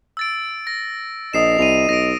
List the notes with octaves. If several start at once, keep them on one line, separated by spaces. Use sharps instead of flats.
E6 A6 D7
A#6
A#1 D#5 D#6 C7 E7
C2 D#7 F7
B1 A#6 D7